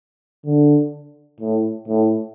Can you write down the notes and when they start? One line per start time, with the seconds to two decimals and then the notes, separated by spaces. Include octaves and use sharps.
0.46 D3
1.41 A2
1.88 A2